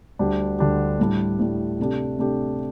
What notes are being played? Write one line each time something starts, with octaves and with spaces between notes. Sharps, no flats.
D2 D3 G3 D4 G4
D2 D3 G3 D4 G4
A2 G3 D4
A2 G3 D4
C3 A3 D4 G4
C3 A3 D4 G4